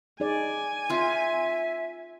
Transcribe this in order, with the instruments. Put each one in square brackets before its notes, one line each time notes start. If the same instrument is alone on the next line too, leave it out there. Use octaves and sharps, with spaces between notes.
[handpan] D#4 G#4 D5 [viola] G#5
[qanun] C4 F4 [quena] E5